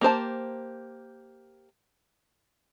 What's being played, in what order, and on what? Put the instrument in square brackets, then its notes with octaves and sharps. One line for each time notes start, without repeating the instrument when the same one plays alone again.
[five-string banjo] A#3 G4 C5 A5